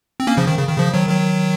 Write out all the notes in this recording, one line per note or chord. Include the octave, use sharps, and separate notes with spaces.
C4
A#3 C#4
C#3 F3
D#3
C#3
D#3
C#3 F3
D#3 F#3
D#3 F#3